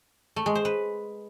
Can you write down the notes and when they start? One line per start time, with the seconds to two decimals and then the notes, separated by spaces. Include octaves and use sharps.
0.36 A3
0.46 G#3
0.55 C5
0.65 B4